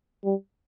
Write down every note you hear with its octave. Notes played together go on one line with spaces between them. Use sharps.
G3